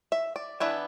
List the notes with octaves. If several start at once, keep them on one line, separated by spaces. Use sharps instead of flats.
E5
D5
E3 B3 D4 E5